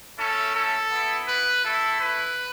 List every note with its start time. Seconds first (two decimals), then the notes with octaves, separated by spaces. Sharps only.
0.18 A3 C#4 E4 A4
0.54 A4
0.91 B3 E4
1.28 B4
1.63 A3 E4 A4
2.00 B4